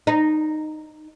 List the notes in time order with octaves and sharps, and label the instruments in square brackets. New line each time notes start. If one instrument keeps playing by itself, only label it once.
[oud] D#4